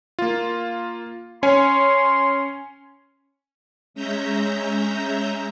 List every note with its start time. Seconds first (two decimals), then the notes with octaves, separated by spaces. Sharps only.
0.19 A#3 F4
1.43 C#4 C#5 G#5 C6
3.94 G#3 C#4 E5 A#5 G6